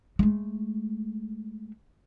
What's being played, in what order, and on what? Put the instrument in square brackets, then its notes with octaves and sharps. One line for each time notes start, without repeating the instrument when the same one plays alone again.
[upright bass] G#3 A3